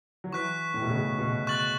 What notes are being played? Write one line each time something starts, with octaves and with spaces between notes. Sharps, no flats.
F#3
E3 C#6 F#6 B6
A2
B2
C#3
B2
C#6 F#6 A6 F#7